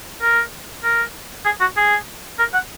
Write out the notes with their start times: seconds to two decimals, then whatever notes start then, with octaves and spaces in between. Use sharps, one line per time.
0.22 A#4
0.84 A#4
1.45 G#4
1.61 F#4
1.77 G#4
2.39 A#4
2.53 F#5